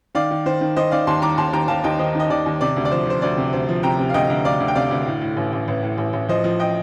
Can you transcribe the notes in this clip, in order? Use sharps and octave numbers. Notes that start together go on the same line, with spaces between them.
D#3 D5 F5
D#3
D#3 C5
D#3
D#3 C5 D#5
D#3 D5 F5
D#2 A5 C6
D#3 A#5 D6
D#2 A5 C6
D#2 G5 A#5
D#2 F5 A5
D#2 D#5 G5
D#3 C5 D#5
D#3 D#5
D#2 D5
D#2
C3 D5
D2
D5
F3 C5
F3 C5
D2 D5
C3
D2 C5
F3
C3 G5 A#5
C3
F5
D2 D#5 G5
D2
D2 D5 F5
D2
G5
C3 D5 F5
D2
A2
A2
A1
A1
A1
A2
A1
A1
F3 C5 D#5
F3
D#5 G5